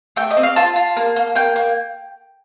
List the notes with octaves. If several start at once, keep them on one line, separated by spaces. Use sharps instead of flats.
A3 G5
D#5
C4
F5
F4 A5
F4
A#3
A#3
A#3 G5
A#3